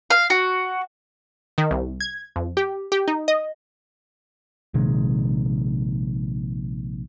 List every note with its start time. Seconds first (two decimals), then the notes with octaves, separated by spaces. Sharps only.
0.10 F5
0.30 F#4
1.58 D#3
1.71 C2
2.01 G#6
2.36 F2
2.57 G4
2.92 G4
3.08 D#4
3.28 D#5
4.74 A#1 C3 D#3 G#3